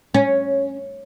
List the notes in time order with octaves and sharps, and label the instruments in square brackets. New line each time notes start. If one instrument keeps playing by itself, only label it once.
[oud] C#4